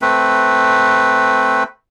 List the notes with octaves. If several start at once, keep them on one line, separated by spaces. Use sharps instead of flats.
A3 C4 B4